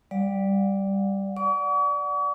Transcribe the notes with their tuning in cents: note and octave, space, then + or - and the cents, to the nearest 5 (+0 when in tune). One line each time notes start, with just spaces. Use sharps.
G3 +0 D5 +0 F#5 -40
D5 +0 F#5 +0 C#6 +45